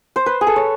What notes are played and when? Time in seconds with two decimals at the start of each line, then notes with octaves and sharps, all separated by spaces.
0.16 C5
0.26 B4
0.41 G#4
0.47 A4
0.56 C#5